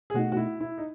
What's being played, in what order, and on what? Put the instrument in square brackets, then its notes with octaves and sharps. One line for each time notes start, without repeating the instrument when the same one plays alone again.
[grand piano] G#4
[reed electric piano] B2 A3 D#4 [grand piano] F#4
[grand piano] F#4
E4
E4
D#4